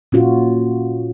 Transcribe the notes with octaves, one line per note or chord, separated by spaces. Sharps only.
A#2 C#4 F4 F#4